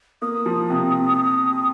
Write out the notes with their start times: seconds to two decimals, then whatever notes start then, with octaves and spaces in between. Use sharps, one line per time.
0.22 A#3 D#6
0.46 F3
0.70 C3